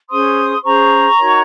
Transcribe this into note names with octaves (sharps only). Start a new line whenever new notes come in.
C#4 G#4 C5 C6 D#6
C#4 G#4 C5 A#5 C#6
D#4 F#4 A#4 C#5